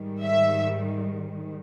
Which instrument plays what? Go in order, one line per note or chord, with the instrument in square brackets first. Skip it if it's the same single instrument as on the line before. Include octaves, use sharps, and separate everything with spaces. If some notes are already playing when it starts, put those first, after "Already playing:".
Already playing: [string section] G#2 D#3 G3
E5